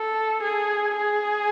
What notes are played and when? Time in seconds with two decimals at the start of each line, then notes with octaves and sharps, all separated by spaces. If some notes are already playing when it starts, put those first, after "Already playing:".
Already playing: A4
0.43 G#4
0.96 G#4